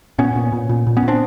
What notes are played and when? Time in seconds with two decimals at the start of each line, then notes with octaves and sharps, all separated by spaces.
0.18 A#2 B3 C#4
0.36 A#2
0.52 A#2
0.69 A#2
0.87 A#2
0.97 B3 C#4
1.02 A#2
1.08 C4 D4